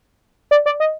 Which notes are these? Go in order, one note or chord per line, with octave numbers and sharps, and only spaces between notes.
D5
D5
D#5